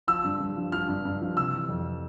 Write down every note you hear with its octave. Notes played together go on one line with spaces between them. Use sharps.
F3 E6
G2
G2
F3
F3 F6
G2
G2
F3
C3 E6
E3
F2